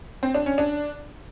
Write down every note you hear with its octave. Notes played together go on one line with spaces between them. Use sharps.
C4
D4
C#4
D4